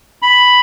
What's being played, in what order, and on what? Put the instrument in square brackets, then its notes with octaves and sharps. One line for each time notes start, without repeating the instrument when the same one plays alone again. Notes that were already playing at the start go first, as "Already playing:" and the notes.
[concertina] B5